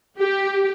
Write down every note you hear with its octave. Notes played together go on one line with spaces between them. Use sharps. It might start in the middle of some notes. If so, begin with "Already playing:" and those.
G4